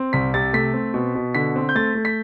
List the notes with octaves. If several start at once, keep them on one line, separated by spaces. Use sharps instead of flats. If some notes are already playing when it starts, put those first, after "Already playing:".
Already playing: C4
C2 B6
C3 A6
A3 B6
C4
B2
B2
D3 B6
C4
G6
A3 A6
A3
B6